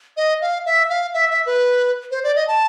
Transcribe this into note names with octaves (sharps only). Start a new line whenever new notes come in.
D#5
F5
E5
F5
E5
E5
B4
C5
D5
D#5
A5